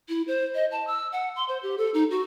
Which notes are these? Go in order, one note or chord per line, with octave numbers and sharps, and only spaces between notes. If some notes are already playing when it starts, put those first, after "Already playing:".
E4
C5
D#5
A5
E6
F#5
C6
C5
G4
A4
D#4
F#4